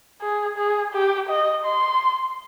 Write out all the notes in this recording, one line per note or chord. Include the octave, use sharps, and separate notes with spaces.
G#4
G#4
G4
D#5
C6